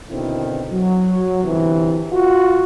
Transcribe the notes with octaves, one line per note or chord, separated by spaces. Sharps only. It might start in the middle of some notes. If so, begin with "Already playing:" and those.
B2 D3 D#3 C4 E4
F#3
G1 C3 E3
F4 F#4